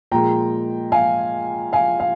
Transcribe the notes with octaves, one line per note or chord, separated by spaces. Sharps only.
A#2 F3 G#3 G5 A#5
F5 G#5
F5 G#5
F5